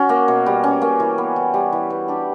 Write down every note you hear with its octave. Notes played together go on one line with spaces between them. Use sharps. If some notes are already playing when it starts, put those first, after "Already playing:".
Already playing: C#4 F#4
A#3
B2
G3
C#4
A#3
E3
B3
E3
G3
E3
B3
D4 G4